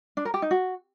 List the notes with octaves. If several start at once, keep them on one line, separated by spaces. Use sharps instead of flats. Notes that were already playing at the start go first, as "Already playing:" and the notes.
D4
A#4
G4
D#4
F#4